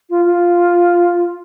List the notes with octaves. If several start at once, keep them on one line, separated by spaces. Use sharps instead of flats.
F4
F4